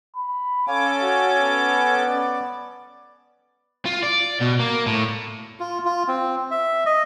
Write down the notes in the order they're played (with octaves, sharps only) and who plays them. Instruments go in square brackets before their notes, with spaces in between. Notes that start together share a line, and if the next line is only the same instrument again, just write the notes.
[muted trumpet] B5
[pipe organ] C#4 A4 D6 [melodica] C#5 G#5 [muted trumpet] F5
[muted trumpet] F#4
B3
[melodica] D5
[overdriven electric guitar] F4
D5
B2
A#3
A2
[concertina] F4
F4
C4
E5
D#5